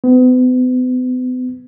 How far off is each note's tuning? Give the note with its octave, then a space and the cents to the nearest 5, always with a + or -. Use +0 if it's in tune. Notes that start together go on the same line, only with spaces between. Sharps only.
B3 +40